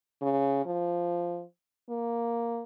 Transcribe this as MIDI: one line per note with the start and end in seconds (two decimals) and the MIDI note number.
0.21 0.65 49
0.66 1.43 53
1.89 2.64 58